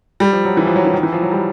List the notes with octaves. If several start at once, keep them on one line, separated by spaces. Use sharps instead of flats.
G3
F3
F#3
E3
F3
F#3
E3
D#3
E3
F3
F#3
G3